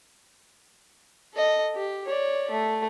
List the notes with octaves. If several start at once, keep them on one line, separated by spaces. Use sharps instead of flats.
A4 D#5
G4
C#5 D5
A3